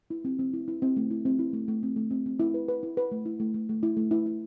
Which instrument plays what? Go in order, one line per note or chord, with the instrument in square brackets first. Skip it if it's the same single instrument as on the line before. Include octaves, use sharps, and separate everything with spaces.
[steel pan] E4
C4
C4
E4
E4
C4
A3
E4
C4
E4
A3
A3
C4
A3
C4
C4
E4
B4
B4
E4
B4
A3
E4
A3
A3
A3
E4
A3
E4
E4